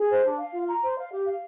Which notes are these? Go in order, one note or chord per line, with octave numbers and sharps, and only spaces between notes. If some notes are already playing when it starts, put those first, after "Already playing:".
Already playing: G#4
C5
D4
F5
F4
A#5
C5
F5
G4
F5